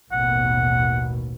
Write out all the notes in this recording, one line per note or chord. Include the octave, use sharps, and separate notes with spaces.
A1 D#2 B2 F#5